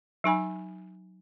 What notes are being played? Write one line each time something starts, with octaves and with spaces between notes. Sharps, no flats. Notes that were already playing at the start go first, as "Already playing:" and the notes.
F#3 D#4 G#5 B5